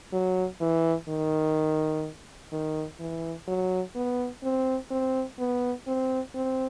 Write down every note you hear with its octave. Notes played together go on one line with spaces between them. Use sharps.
F#3
E3
D#3
D#3
E3
F#3
B3
C4
C4
B3
C4
C4